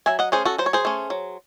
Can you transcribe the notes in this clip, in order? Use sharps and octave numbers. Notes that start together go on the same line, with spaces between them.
F#3 E5 G#5
D#5 F#5
A3 C#4 G#4 C5
F#4 A4
F#3 C5
C#5
G#4 C5
A3 C#4
F#3